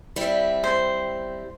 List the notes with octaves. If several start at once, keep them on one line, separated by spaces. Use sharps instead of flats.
G3 C4 E4
C5